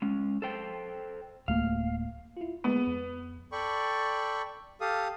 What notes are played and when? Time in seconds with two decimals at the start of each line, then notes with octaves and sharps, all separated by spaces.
0.02 G#3 C#4
0.42 A4 C5 G5
1.48 D1 A3 A#3 F5
2.37 E4 F4
2.64 G#3 A#3 B3
2.87 F2
3.52 A4 D5 G5 B5 C#6
4.81 G4 A4 F5 D#6